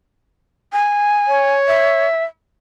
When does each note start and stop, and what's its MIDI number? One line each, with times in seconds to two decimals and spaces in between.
0.73 1.54 80
1.27 2.07 73
1.68 2.24 76